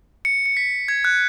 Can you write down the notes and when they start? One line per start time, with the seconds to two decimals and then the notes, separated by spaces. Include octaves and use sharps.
0.25 C#7
0.46 C#7
0.57 B6
0.88 G#6
1.05 F#6